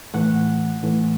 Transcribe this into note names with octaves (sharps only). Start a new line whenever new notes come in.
A2 E3 A3 F#5
A2 E3 A3